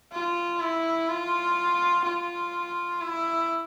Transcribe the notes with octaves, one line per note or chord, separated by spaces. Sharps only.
F4
E4
F4
F4
E4